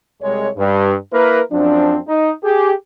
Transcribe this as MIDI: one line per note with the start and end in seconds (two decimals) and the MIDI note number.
0.22 0.48 36
0.22 0.48 56
0.22 0.48 73
0.57 0.95 43
1.13 1.41 58
1.13 1.41 64
1.13 1.41 70
1.13 1.41 71
1.52 1.98 42
1.52 1.98 53
1.52 1.98 60
1.52 1.98 62
2.08 2.32 63
2.44 2.73 67
2.44 2.73 68